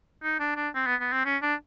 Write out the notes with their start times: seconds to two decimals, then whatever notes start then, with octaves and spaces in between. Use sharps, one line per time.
0.23 D#4
0.39 D4
0.56 D4
0.75 C4
0.86 B3
1.00 B3
1.12 C4
1.25 C#4
1.42 D4